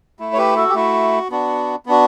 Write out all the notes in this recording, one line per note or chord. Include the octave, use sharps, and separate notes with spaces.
A3 E4
C#5
G4 B4
F#4 A4
G4
A3 E4 F#4
B3 D4 F#4
B3 D4 F#4